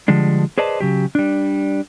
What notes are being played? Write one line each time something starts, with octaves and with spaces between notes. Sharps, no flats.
D3 F3 G3 G#3 D4
G#4 B4 C5 D5 D#5 A5
C#3 F#3 G4
G3 D4